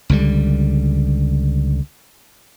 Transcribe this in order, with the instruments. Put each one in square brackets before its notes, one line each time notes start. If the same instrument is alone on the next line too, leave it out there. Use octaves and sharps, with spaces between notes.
[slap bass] C#2 D3 G3